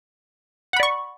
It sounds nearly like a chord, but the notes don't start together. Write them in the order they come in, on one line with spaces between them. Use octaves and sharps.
F#5 B5 D5 C#6